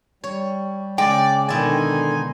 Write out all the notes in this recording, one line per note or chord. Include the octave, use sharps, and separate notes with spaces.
G3 C#5
C#3 G#3 D5 G5
B2 D3 D#3 D#4 E4 D5 G#5 C6